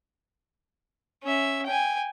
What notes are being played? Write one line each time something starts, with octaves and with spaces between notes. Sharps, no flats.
C#4 E5
G5 G#5